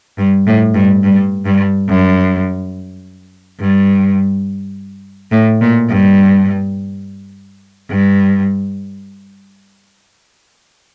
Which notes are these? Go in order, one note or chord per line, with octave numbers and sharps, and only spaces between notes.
G2
A2
G2
G2
G2
F#2
G2
A2
A#2
G2
G2